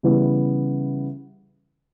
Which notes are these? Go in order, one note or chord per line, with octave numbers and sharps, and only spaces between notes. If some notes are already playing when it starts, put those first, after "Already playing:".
C#3 E3 G3 B3 E4